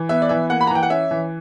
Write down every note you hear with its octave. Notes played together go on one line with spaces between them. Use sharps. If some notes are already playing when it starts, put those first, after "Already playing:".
Already playing: E3
B3 E5
D5
E3 E5
A#3 F#5
B5
A#5
E3 G5
F#5
C#4 E5
E3